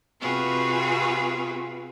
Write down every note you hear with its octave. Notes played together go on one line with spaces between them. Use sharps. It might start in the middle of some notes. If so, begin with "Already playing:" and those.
C3 C4 F4 F#4 G#4 B4